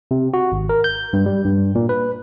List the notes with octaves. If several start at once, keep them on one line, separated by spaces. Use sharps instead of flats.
C3
F#4
G#1
A#4
G6
G2
G3
G2
A#2
B4